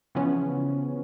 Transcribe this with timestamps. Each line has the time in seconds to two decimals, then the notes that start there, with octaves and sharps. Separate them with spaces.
0.15 C#3 E3 F3 B3 C#4